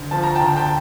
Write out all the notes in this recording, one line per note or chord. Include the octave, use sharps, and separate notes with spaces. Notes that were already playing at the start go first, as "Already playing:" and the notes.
Already playing: D2
F3 A5
A#5
G5 A5
D2
G5 A5